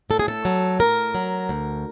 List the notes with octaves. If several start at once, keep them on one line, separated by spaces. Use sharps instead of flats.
A2 A4
G#4
A4
F#3
A2 A#4
F#3
D2